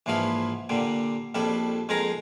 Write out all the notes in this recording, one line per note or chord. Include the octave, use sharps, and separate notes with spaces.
A#1 G#2 E3 F3 F4 B5
A#2 D3 G3
A#1 F2 G3 A4 B5
F2 G#3 D#4 G#4 A#4 A#5